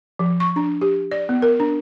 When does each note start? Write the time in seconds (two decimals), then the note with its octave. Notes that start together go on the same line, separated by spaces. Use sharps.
0.19 F3
0.40 C#6
0.56 D4
0.81 G4
1.11 D5
1.29 B3
1.42 A#4
1.60 D4